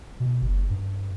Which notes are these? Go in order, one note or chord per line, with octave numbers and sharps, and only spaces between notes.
B2
F#1
G2